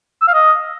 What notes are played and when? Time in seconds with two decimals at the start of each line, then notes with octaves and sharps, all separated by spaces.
0.22 E6
0.28 F5
0.34 D#5